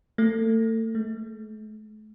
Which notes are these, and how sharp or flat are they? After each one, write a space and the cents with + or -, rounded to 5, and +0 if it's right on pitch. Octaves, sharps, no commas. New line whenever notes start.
A3 +35
A3 -40